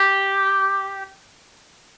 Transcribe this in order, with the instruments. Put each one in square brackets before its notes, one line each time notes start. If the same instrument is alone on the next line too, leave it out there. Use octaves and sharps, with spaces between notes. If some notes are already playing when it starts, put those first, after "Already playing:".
Already playing: [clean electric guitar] G4